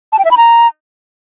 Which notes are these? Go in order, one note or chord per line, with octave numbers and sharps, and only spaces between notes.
A5
G5
E5
B5
A#5